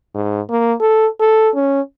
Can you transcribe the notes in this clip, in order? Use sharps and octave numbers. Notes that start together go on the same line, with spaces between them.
G#2
A#3
A4
A4
C#4